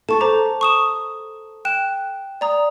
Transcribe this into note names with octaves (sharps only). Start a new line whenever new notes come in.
A4 A5 C#6
C5 A#5 D6
C#6 D#6 E7
G5 F#6 E7
D5 A#5 D#6